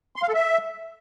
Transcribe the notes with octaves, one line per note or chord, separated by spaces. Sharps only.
C6
F5
A4
E5